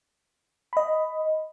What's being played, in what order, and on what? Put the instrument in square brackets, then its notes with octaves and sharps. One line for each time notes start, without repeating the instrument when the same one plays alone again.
[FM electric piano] D#5 B5